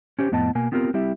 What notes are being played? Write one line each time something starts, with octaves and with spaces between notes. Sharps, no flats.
C#4 G4 C5
F2 A2 B3 D#5 A5
B2 A#3 G#5
B3 C4 F4 G4 A#4
G3 C4 E4 G4 E5